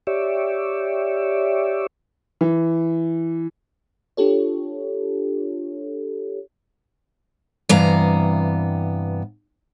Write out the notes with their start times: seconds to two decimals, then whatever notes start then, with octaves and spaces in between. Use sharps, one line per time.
0.07 G4 C#5 D5 E5
2.41 E3
4.17 D4 F4 G4 A4 C#5
7.69 G2 C3 E3 B3 F5 A#5